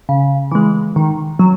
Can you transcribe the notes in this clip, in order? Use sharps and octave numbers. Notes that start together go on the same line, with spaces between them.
C#3
E3 G#3
D#3
F#3